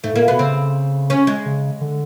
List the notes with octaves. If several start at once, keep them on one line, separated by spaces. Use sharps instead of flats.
G#2 A3
A2 A#3
A#2
B2 B3
C#3 C4
C#4
G#3
C#3
D3